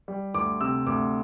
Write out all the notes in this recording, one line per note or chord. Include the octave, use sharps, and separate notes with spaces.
G3
D2 D6
C3 E6
D2 D6